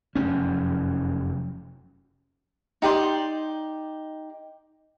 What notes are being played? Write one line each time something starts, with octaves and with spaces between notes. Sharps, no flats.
F1 F#2 C#4
D#4 G4 D5 C6